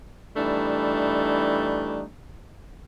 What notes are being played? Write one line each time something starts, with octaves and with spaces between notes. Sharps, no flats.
E3 G3 A3 D4 D#4